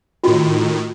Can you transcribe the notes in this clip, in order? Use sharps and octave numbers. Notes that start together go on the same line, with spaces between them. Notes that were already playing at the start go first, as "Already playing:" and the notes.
A2 D#3 F4 F#4